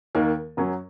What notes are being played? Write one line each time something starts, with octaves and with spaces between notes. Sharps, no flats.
D#2 D#3 A#3
F#2 F#3 C#4